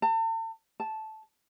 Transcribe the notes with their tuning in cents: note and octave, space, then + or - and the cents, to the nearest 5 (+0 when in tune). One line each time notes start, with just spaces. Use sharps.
A5 +40
A5 -10